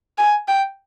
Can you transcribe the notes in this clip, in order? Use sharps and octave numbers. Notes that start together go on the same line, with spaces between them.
G#5
G5